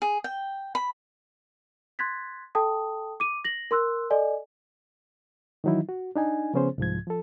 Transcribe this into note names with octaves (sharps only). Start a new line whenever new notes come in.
G#4
G5
B5
C6 F#6 G#6 A6 B6
A4 G5 A5 D#6
D6 D#7
A#6 F#7
A#4 C6 E6 F#6
A4 D5 D#5 G#5
D#3 E3 F#3 D#4 E4
F#4
D4 D#4 G#5
C#3 F3 B3 C#4 G#4 C5
C2 G#2 F3 G#6
F3 A4